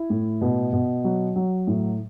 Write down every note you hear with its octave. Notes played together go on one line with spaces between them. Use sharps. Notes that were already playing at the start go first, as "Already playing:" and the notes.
Already playing: E4
A2
B2
B2
F#3
F#3
A2